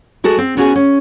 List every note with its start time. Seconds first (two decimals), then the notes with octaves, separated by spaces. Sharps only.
0.24 G#3 F#4 G#4 A4
0.38 C4
0.57 B3 C#4 F#4 G#4 G5 G#5
0.76 C#4